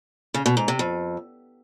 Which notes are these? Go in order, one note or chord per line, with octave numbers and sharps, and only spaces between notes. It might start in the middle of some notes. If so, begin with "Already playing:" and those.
C#3
B2
G#2
C3
F2